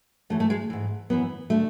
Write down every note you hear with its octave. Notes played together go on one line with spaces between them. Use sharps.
F#2 E3 A3
A3
G#3
G#2 E3
F#2 E3 B3
D3 A3